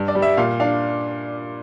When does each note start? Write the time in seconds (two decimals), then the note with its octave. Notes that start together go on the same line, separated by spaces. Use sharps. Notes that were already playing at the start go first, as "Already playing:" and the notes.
Already playing: G2
0.08 D5
0.15 G3
0.22 E5
0.37 A#2 F5
0.60 D4 F5